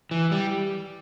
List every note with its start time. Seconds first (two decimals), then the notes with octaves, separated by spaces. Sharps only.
0.11 E3
0.32 G3